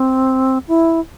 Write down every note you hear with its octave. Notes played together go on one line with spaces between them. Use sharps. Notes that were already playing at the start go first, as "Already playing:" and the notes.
Already playing: C4
E4